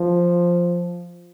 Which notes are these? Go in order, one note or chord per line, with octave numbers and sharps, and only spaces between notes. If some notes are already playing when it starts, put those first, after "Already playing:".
Already playing: F3